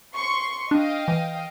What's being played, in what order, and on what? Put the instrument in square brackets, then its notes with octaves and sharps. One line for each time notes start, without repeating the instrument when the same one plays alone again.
[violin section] C6 C#6
[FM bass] D4 [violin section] D#5 F5 G5
[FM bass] E3